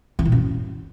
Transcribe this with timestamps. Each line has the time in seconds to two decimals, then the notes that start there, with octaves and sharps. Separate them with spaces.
0.19 E3
0.25 A#2
0.32 F#2